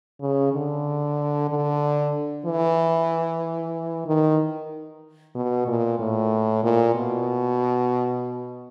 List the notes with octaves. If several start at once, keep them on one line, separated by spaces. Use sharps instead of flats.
C#3
D3
D3
E3
D#3
B2
A#2
A2
A#2
B2